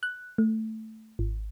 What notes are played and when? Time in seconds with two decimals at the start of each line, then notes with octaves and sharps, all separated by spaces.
0.03 F#6
0.38 A3
1.19 G#1